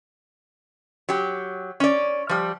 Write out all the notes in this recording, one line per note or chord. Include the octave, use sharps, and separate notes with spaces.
F#3 G4
C#4 D5
F3 G3